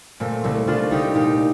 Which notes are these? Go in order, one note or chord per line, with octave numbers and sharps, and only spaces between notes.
A#2 A3 C4
C2 A3 C4
C2 D4 F4
C2 D#4 G4
A#2 D#4 G4